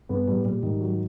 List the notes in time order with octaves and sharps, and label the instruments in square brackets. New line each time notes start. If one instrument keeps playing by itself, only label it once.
[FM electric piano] G2 [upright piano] B3
[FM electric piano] A2 [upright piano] G3
[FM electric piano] A#2 [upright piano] G3
[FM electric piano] G#2 [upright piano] D#3
[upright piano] F#3